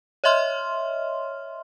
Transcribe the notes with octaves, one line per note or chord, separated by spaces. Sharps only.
C#5 D#5 E5 C6 F6